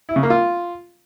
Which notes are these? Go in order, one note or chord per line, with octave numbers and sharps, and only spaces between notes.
E4
C#3
A#3
F4